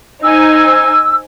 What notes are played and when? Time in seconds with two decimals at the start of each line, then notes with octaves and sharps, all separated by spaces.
0.23 D#4 C5 G#5 E6